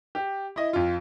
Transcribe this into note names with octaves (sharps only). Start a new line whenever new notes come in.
G4
E4 D#5
F2 F4